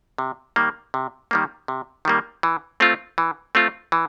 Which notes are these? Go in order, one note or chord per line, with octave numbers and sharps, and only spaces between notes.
C3
D#3 G3 A#3
C3
D#3 G3 A#3
C3
D#3 G3 A#3
E3
A3 C4 F4
E3
A3 C4 F4
E3